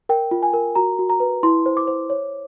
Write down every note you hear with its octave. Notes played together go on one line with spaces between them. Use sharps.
A#4 G5
F4
G#5
A#4
F#4 A#5
F#4
A#5
B4
E4 C6
C5
D6
C5
C#5